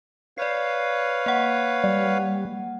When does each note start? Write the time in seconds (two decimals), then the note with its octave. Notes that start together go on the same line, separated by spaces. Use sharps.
0.38 B4 C#5 D5 F5 C7
1.26 A#3 F#5
1.84 G3